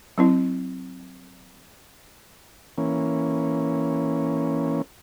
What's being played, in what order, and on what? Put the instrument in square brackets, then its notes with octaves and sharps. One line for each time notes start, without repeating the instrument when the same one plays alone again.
[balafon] F#3 C4 E4
[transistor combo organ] E3 A#3 C#4